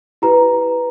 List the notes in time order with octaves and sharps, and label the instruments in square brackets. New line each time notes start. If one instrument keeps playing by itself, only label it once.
[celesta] E4 G4 B4 A#5